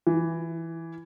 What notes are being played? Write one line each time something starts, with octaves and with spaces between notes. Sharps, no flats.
E3